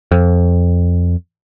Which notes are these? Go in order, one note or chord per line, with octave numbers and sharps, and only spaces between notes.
F2